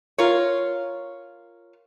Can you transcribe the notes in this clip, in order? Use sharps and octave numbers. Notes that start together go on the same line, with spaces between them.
F4 A#4 C#5